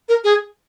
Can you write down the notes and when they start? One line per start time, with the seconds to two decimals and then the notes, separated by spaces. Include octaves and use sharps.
0.09 A#4
0.24 G#4